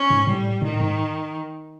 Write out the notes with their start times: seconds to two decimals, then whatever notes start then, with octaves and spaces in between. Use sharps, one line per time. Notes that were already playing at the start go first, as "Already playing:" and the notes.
Already playing: C#4
0.10 G#2
0.27 A2 G3
0.62 A2 D#3
0.80 G#2